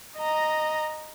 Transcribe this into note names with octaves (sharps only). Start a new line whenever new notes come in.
D#5 A#5